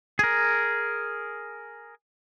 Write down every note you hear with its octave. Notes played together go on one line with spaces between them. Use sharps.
G#4 A#4